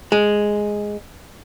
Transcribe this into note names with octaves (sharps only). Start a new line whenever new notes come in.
G#3